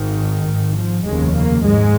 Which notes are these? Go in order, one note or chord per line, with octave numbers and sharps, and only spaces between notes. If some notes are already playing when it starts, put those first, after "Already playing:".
Already playing: G#1 G#2 D#3
G#1 G#2
F3
F1 D#2 C#3 G#3
A#3
G#2 G#3